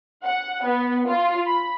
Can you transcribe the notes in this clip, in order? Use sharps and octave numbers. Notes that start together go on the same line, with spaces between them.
F#5
B3
F4
B5